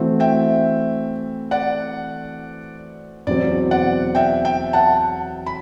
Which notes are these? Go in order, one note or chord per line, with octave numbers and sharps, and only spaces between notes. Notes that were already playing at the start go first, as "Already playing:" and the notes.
Already playing: E3 A3 C4 F#4
E5 G5
D5 F#5
E2 B2 F#3 C4 D5
D5 F#5
E5 G5
E5 G5
F#5 A5
B5